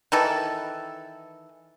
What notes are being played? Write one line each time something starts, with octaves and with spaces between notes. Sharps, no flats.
D#3 E3 A4